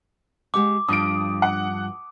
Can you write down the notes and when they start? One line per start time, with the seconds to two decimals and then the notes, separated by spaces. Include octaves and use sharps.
0.54 G#3 G4 F#5 D6
0.89 G2 F3 D4 D#6 D7
1.42 F#5